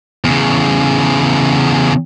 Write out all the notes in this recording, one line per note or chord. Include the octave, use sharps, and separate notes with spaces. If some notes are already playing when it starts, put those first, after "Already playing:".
E2 C#3